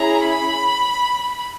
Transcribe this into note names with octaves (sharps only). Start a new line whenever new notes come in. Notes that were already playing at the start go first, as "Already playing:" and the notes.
Already playing: C#4 E4 G#4 A#5
B5